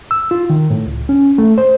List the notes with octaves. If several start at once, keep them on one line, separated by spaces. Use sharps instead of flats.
E6
F4
D#3
A2
C#2
C#4
A3
C5